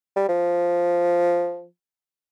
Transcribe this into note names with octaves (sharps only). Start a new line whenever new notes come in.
G3
F3